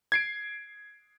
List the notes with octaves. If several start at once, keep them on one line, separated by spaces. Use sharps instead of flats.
G#6 C7 D7